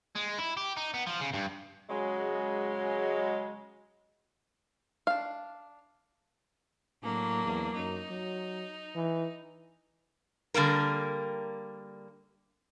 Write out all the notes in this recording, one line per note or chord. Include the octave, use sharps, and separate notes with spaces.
G#3
E4
G4
D#4
B3
F3
C#3
G2
C#3 F#3 G#3
D4 F5
A2 F#3 A#3 D4
E2
F#2 D#4
F#3
E3
D3 G3 A#3 A#4